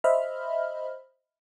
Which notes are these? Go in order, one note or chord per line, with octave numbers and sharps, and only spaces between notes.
C5 D#5 E5 B5 F6